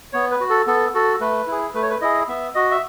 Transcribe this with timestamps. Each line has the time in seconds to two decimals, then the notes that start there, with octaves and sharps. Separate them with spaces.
0.13 B3 C#5
0.31 B4
0.40 F#4
0.50 A4
0.67 B3 A4
0.95 F#4 A4
1.21 A3 B4
1.47 E4 G#4
1.74 A3 B4
1.83 C#5
1.90 B4
2.01 E4 G#4 D#5
2.28 B3 E5
2.55 F#4 D#5
2.71 E5